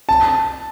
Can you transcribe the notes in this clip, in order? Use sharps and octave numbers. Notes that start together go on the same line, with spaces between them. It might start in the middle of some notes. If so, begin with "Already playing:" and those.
A5